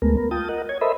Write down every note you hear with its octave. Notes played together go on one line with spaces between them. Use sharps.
D2 G#3 A3 B3 A#4
B3 A#4
F4 G5 A5 D#6
A#4 D#5 F#5
C#5 G#6
A4 A#4 C5 D#5 E5 B5